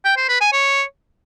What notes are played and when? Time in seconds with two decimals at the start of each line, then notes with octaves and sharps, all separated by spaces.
0.05 G5
0.17 C5
0.29 B4
0.40 G#5
0.52 C#5